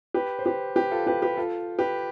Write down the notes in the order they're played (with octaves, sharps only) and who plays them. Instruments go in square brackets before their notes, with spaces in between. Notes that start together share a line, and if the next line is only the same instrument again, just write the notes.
[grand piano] G4 B4
C5
G4 B4
G4 B4
F4 A4
G4 B4
G4 B4
F4 A4
G4 B4